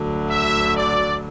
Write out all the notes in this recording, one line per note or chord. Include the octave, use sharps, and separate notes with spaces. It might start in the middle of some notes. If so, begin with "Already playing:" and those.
Already playing: D2 D3 F#3
E5
D5